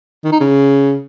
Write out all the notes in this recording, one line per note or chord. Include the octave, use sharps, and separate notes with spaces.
D#3
D#4
C#3